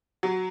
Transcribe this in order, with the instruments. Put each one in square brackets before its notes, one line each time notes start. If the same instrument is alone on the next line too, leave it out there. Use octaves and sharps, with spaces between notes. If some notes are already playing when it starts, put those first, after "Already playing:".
[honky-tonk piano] F#3